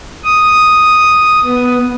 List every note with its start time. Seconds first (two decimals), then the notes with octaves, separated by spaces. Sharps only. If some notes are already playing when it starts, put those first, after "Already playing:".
0.24 D#6
1.45 B3